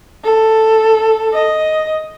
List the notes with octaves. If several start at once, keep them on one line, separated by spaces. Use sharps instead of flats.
A4
D#5